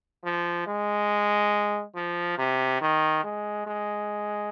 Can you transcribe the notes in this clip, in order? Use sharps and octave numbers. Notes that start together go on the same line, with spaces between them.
F3
G#3
F3
C3
D#3
G#3
G#3